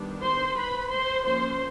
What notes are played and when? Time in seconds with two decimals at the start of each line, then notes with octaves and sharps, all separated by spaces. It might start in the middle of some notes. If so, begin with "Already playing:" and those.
Already playing: D#3 G3 B3 D4
0.22 C5 C6
0.57 B4 B5
0.90 C5 C6
1.24 F3 A#3 C#4 C5 C6